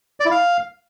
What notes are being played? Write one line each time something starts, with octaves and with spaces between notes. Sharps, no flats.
D5
E4
F5